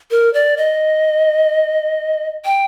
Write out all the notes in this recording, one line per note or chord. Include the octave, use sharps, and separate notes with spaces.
A#4
D5
D#5
G5